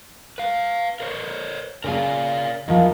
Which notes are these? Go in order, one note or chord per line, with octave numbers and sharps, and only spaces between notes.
B4 F5
A#4 C5 C#5
C#3 A#4 D5 F5 G#5
E2 D#3 F3